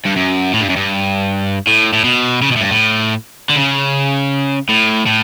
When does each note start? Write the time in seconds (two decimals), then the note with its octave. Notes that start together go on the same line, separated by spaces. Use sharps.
0.05 G2
0.16 F#2
0.53 A2
0.61 G2
0.70 F#2
0.76 G2
1.67 A2
1.93 A2
2.04 B2
2.42 C#3
2.52 B2
2.56 A2
2.61 G2
2.71 A2
3.50 D3
3.56 C#3
4.69 A2
5.06 A2